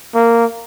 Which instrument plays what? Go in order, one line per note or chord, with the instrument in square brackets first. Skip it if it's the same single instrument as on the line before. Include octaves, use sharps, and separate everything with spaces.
[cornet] A#3